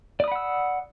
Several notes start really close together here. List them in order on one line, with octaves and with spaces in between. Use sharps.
D5 D#6 B5 F#5 E6